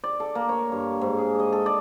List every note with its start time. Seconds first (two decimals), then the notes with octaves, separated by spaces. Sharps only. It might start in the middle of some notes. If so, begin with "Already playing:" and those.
0.04 D5
0.20 A4
0.35 A#3
0.49 C#5
0.72 G2
1.01 G#2
1.18 G#4
1.40 D#5
1.52 A4
1.66 D5